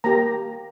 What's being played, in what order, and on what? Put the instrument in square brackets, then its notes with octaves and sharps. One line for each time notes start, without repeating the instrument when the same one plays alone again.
[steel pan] A#3 G4 A#5